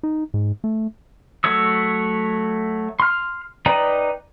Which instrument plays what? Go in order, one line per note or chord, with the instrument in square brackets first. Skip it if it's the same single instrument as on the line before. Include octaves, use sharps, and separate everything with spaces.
[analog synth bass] D#4
G#2
A3
[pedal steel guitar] F#3 A3 C#5 E6
C6 F6
D#4 B4 D5 G5 A#5